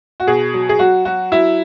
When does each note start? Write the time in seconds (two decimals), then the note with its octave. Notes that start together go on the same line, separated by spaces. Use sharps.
0.20 F#4
0.27 B2 G#4
0.54 F#3
0.69 G#4
0.79 F#3 F#4
1.05 F#3 F#4
1.32 F#3 E4